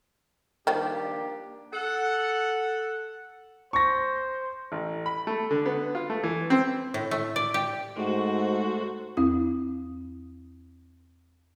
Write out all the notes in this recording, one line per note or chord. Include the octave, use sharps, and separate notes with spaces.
D#3 F3 G3 A#3 D4 G4
A4 F#5
C5 C#6 A#6
A1
B5
A3
D3
B3
F4
A3
E3
C4
A2
A3
D5
G4
G#2 A3 F#4 C5
E2 C4 E4 D#6